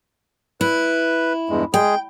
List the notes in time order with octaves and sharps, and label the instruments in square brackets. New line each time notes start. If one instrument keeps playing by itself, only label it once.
[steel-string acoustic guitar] E4 [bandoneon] B4
[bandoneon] E2 G2 G#3
[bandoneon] G#3 G#4 [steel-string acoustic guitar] G5